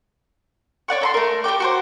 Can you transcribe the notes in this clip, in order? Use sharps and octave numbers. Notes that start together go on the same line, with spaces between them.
C#5 D5 F#5 C#6
A4 A#5 C6
A3 A#4
G4 A#4 G5 D6
F#4 A#4 C5